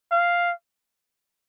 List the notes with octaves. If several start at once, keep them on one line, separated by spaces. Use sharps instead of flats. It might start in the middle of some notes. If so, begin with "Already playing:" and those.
F5